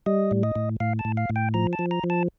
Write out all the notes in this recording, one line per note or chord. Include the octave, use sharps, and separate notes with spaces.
G3 D#5
A2
D#5
A2
A2 F5
A5
A2
F5
A2
G5
F3 A#5
A5
F3
A#5
F3
A5